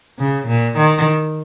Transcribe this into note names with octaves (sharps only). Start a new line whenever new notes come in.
C#3
A#2
D#3